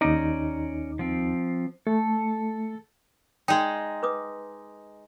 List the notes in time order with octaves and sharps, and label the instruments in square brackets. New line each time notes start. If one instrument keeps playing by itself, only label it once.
[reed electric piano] D#2 D#4 [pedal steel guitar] C#4 D5 A#5
[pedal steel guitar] F3 C4
[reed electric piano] A3 [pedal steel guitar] A4
[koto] G#3 D#4 [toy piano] D5 G5
[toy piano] B4 D6 D#6